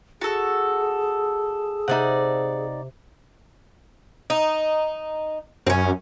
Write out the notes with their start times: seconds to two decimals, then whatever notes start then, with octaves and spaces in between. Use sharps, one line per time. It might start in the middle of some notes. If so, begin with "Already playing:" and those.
0.21 F#4 G#4 A4 A5
1.88 C3 D#4 D5 E5 F#5
4.30 D#4
5.67 F#2 C4 C#4